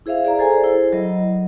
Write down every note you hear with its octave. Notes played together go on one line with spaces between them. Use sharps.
E4 G#4 C5 E5 F5
G#4 D5 A#5
G#4 A4 C5 G#5
E4 C5
F#3 D#5